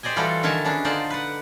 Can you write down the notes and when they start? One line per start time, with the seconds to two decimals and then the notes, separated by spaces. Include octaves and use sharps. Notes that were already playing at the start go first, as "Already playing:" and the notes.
0.03 G4 C5 D5 D#5 G#5
0.16 E3 G3 F4 F#4 A4
0.43 D3 D#3 A#4 E5 G#5 A5
0.65 B3 C#4 D4 G#4
0.85 D3 D#4 F4 C5 D5 A5
1.10 B4 F#5